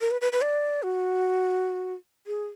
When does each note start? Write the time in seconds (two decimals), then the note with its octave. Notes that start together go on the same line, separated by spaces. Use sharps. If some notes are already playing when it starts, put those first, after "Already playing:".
0.01 A#4
0.11 B4
0.21 B4
0.33 B4
0.42 D5
0.83 F#4
2.27 G#4